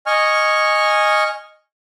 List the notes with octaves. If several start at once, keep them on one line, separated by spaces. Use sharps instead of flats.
D#5 G#5 C#6 F6